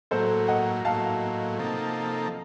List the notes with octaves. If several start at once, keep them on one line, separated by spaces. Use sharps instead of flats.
A2 F#3 A#3 A4 C5
D#5 F#5
A2 F#3 A#3 F5 A5
C3 F3 A#3 D#4 A4